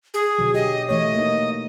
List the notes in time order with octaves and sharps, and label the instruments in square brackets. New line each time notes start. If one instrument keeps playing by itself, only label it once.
[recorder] G#4
[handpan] B2 D3 F#3
[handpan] G4 [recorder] D#5
[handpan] E3 A3 C#5 [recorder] D#5
[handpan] A#3 D#4